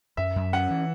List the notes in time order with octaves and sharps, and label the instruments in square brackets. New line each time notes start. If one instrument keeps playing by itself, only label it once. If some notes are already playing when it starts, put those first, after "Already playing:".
[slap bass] F#2 [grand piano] E5
[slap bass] F#2
[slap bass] C#4 [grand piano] F#5
[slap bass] E3